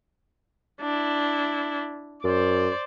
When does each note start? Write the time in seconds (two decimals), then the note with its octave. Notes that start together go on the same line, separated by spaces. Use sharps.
0.81 D4 E4
2.24 F#2 C5 D5